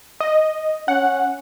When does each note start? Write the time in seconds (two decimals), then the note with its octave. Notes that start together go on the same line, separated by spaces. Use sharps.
0.20 D#5
0.88 C#4 F#5